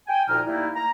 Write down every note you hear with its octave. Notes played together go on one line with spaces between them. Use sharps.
G5 G#5
D2 A#2 F3 D#4 A#5 F6
G3 A3 A#3 D#4 E4
A#5